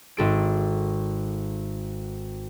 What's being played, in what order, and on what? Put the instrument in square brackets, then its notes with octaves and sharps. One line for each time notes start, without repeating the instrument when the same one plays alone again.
[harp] G#1 A4 D7